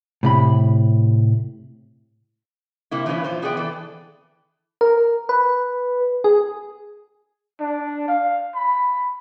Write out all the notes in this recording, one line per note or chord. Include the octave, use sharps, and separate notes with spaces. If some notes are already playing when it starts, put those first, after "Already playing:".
A2 C3 B5
C3 A#3 E4
E3 F3 C#4 E4 F4 B4
A#2 F4 C5
C3 B3 G#4 A#4 D5 G5
E3 A4
A#4
B4
G#4
D4
F5
B5